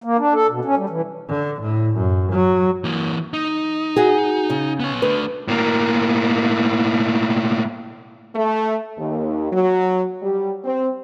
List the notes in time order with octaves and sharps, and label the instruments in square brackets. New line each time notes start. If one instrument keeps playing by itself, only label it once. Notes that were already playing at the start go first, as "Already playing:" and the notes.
[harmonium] A#3
D4
A4
B2
C#4
G3
E3
[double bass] D3
A2
F#2
F#3
[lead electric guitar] E3 A#3
D#4
[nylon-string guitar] F#4 G#4
C#3
[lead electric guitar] B3 C#5
[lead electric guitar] A3 D4 [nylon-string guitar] B4
[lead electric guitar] A2 A#3
[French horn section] A3
D#2
F#3
G3
C4